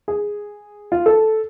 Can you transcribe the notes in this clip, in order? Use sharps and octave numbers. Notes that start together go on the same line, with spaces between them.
G#4
F4
A4